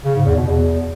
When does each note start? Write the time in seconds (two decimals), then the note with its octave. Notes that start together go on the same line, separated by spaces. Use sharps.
0.05 C#3
0.15 G#2
0.26 E2
0.36 B2
0.47 E2